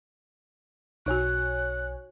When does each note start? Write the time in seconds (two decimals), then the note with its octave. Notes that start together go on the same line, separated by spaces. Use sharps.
1.06 B1 D#4 F#4 C#5 G#5 F#6